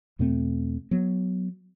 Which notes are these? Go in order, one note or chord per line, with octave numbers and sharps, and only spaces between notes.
E2 B2 A3 C4
F#3 B3